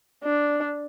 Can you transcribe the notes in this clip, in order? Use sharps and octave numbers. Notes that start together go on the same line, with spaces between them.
D4